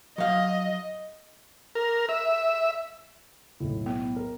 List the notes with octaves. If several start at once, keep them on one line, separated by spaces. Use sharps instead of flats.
F#3 D#5 F5
A#4
E5
B1 A2
B3
A#4